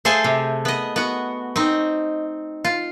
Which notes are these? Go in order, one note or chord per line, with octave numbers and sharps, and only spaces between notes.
A3 G#4 A4 C5 F5 G#5
C3
B3 D#5
B3 F#4
C4 D#4
F4